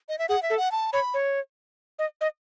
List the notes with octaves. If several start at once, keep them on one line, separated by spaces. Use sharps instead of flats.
D#5
E5
G#4 F#5
E5
A4
F#5
A5
C#5 B5
C#5
D#5
D#5